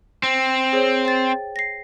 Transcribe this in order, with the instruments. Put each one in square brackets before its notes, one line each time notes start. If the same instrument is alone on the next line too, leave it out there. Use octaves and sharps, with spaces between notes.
[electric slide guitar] C4
[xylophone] G#4 C5 C#5
G5 A6
A#6 C7